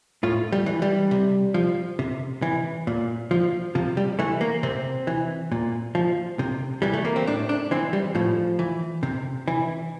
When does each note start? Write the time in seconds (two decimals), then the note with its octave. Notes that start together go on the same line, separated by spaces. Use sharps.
0.23 A2 F4
0.52 G3
0.66 E3
0.82 G3
1.11 C3
1.54 F3
1.99 C3
2.42 E3
2.87 A#2
3.31 F3
3.75 C3 F3
3.97 G3
4.19 E3 A3
4.41 A#3
4.63 C3 C4
5.07 E3
5.52 A#2
5.95 F3
6.39 C3
6.82 E3 G3
6.94 A3
7.05 A#3
7.16 C4
7.27 A2 D4
7.49 D4
7.71 E3 C4
7.93 G3
8.15 A2 F3
8.59 E3
9.03 C3
9.48 E3